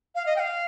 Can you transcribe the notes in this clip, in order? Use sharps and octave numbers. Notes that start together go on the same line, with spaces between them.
F5
D#5
G5
F5